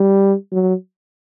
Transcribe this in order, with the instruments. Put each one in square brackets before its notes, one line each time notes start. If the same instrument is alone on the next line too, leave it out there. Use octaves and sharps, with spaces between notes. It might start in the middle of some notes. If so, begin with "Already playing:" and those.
Already playing: [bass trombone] G3
F#3